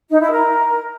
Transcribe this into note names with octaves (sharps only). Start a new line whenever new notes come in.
D#4
E4
A#4